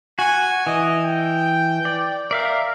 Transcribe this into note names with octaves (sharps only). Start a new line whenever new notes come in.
F#4 F#5 G#5
E3 D#5
G5
D5
A#4 D5 E5 F5